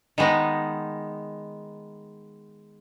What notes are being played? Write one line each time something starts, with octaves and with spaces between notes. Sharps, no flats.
D#3 G#3 B3 D#4